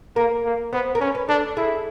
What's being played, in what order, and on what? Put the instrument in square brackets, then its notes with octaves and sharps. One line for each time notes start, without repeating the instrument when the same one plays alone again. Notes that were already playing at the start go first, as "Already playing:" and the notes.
[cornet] A#3 [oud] A#4
[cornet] A#3
[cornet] B3 [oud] C5
[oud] A#4
[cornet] C#4 [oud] B4
[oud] B4
[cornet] D4 [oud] A4
[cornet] E4 [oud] G#4